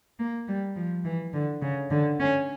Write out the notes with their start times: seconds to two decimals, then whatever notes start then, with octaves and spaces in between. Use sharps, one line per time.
0.19 A#3
0.48 G3
0.76 F3
1.05 E3
1.33 D3
1.62 C#3
1.91 D3
2.19 C#4